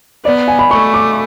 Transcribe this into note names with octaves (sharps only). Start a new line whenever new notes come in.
B3 D5
G#5
B5
A3 C#6
D6